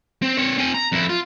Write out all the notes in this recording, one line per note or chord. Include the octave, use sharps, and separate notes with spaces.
C4
C4 C#5
C4 G#5
A#5
F2 E4
F4